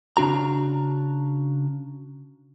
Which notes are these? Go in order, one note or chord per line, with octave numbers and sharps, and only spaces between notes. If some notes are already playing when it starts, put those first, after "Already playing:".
C#3 D4 F#4 A#5